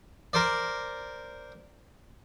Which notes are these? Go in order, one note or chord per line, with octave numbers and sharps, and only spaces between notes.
A#4 C5 D5